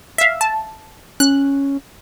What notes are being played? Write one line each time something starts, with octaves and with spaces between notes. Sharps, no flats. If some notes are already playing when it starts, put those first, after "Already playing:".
E5 F5
A5
C#4 F#6